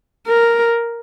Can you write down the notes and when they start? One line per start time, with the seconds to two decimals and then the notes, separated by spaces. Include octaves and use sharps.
0.27 A#4